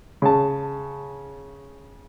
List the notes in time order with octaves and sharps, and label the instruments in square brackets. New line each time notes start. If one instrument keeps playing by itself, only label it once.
[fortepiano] C#3 A5